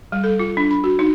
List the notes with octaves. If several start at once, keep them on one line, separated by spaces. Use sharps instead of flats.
G3
A4
F4
D4
B5
F#4
D#4